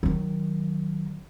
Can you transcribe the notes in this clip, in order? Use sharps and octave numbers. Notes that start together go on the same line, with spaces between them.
D#3 F#3